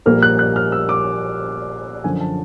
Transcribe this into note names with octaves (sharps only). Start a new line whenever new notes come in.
A#1 A#2 G3 A#3 F6
F#6
F#6
F6
E6
D6
F#2 D3 F3 G#5
A5